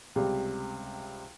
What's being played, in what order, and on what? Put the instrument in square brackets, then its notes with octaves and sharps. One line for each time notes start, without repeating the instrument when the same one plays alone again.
[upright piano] C#2 C3 G3